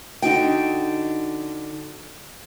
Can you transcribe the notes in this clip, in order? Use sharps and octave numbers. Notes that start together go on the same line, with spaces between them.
D3 D#4 F#4 G5